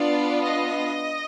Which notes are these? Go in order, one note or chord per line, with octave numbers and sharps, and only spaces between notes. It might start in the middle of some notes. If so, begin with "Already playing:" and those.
Already playing: B3 D4 F4 D5
D#5